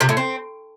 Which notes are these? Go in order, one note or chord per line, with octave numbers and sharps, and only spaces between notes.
C3
A2
C4